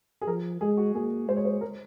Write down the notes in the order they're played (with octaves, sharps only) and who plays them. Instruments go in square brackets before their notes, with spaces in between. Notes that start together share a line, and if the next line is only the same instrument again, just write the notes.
[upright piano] G#4
[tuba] F3 [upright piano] A#4
[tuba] G#3 [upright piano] G#4
[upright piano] F#4
[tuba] A#3 [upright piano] G#4
[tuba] G#3 [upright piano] C5
[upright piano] C#5
C5
A#4